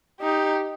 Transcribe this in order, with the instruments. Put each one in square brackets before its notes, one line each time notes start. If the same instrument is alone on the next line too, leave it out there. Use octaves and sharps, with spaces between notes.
[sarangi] D#4 [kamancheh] G4